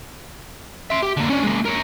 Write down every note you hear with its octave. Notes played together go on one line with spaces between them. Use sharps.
E5 C6
G4
D3 A#3
C#4 D4
G#3 A#3
A#4 C#5